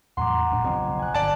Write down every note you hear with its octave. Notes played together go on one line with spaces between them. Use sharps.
E2 A2 F#3 F#5 A#5 C6 D6
D#1 A2 D4
F#1 B1 F2
G#5 F#6
G1 D5 A5